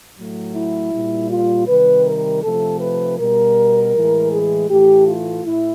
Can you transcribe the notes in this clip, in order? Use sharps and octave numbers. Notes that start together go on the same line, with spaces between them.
A2 F#3 A3
E4
A#2 G3
F4
C3 D#3 G3 B4
A#4
C3 F3 A3 A4
B4
B2 G3 A#4
A2 E3 G#3
G#4
A2 E3 A3 G4
F4
A2 E4